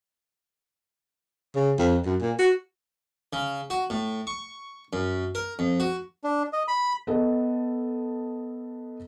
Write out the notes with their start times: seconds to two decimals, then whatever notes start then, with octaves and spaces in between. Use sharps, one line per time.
1.55 C#3
1.79 F2
2.06 F#2
2.21 A#2
2.39 F#4
3.33 C#3
3.70 F#4
3.90 A2
4.27 C#6
4.93 F#2
5.35 A#4
5.59 F2
5.80 F#4
6.24 D4
6.53 D#5
6.68 B5
7.07 B3 A4 D#5